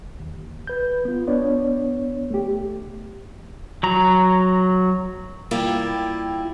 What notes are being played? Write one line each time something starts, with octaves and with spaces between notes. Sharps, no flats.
D#2
B4 G6
B3 F4
B3 D4 C#5 D5
A3 G4
F#3 A#5
G3 A#3 E4 F4 G4